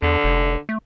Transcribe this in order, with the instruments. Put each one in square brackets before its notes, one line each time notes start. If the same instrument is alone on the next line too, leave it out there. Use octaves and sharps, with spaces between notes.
[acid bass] E2 [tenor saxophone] D3
[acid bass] F1
A3